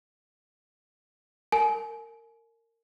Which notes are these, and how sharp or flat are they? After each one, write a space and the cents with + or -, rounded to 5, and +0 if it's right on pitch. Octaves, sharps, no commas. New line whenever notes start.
A#4 -25 G#5 +35